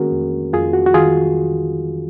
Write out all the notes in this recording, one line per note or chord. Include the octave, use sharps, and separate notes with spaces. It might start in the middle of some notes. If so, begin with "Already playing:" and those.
Already playing: D#3 A#3 C#4 F#4 G#4 A#4
F2
F2 F4 G#4
F#4
F#4
D#3 F4 G#4